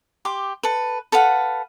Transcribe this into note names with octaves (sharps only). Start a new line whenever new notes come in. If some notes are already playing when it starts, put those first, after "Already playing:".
G4 C6 D6
A4 B4
A4 B4 F5 F#5